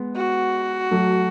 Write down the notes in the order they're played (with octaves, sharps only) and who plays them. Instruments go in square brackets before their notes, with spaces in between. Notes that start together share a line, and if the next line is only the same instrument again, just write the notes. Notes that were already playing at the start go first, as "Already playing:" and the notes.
Already playing: [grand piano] G#3 B3
[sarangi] F#4
[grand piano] F#3 A3